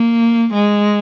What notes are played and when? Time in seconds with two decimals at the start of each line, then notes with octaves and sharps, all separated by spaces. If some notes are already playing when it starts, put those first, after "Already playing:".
Already playing: A#3
0.53 G#3